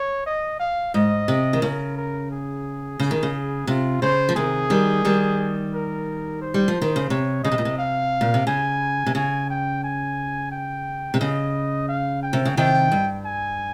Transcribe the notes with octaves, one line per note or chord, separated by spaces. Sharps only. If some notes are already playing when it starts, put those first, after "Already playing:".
Already playing: C#5
D#5
F5
G#2 D#5
C3
D#3
C#3 A#4
A#4
G#4
C#3
D#3
C#3
C3 F4
C#3 C5
F3
C3 D#3 G#4
D#3 G3
D#3 G3
A#4
C5
G3
F3
D#3
C#3
C3 C#5
C#3 D#5
C3
A#2
C3
F5
A#2
C3
C#3 G#5
C3
C#3 G#5
G5
G#5
G5
C3
C#3 D#5
F5
G5
C3
C#3
C3 D#3 G5
G2
G#5